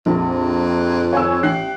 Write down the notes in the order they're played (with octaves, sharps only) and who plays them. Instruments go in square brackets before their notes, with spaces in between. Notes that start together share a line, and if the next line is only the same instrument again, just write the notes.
[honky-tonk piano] A#1 [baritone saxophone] F2
[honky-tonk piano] C#5 G#5 E6
[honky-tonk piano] A1 F#6 C7 [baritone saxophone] G4